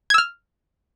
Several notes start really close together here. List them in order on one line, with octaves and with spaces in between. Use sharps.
G#6 E6 F6